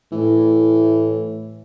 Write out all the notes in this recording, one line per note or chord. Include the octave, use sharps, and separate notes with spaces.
A2 E3